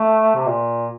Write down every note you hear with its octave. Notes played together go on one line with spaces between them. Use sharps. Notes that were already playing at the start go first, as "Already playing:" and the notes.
Already playing: A3
C3
A#2